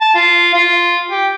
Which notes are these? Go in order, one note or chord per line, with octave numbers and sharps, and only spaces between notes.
A5
F4
F4
G4